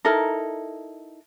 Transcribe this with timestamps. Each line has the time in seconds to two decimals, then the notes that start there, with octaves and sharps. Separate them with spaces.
0.05 D#4 E4 A4 A#4